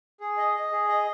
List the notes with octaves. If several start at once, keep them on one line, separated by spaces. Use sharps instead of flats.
G#4
D#5
D#5
G#4
D#5